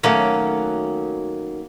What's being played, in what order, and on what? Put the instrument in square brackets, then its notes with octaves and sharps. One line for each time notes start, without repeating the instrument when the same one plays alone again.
[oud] D#3 F#3 A3 [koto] A#3 C#4